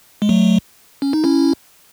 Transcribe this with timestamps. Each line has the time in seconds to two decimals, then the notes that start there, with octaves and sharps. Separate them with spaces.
0.22 G#3
0.29 F#3 A3
1.02 C#4
1.13 D#4
1.24 C#4 E4